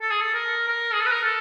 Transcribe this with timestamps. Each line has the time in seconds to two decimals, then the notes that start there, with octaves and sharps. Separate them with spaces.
0.01 A4
0.11 G#4
0.21 A4
0.34 A#4
0.68 A#4
0.93 G#4
1.01 A4
1.06 B4
1.11 A#4
1.23 A4